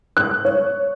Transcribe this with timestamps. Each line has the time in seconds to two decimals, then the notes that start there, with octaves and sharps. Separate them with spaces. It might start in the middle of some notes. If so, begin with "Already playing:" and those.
0.17 F#6
0.45 C#5